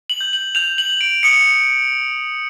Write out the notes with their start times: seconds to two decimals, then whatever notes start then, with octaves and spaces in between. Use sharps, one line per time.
0.10 F#7
0.21 G6
0.33 F#7
0.55 G6 F7
0.78 F#7
0.90 G6
1.01 D7
1.23 D#6 C#7